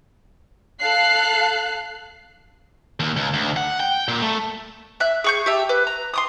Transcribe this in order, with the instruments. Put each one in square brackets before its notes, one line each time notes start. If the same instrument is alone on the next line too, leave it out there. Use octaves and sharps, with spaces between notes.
[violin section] A4 F5 F#6 C7
[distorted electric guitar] D#2
C#2
D2
F#5
G5
A#2
A3
[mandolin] E5 F#6
G#4 C#6 G6
G4 E5 A5
B4
A#5
C6 D6 D#6